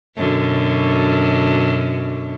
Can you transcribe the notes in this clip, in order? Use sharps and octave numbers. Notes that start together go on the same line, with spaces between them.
F#2 B2 D3